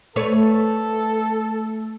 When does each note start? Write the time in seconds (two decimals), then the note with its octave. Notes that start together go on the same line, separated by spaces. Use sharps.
0.16 A3 A4 B4 C#5